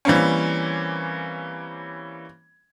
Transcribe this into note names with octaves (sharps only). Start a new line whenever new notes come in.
E3 G3 A#3 C4 C#4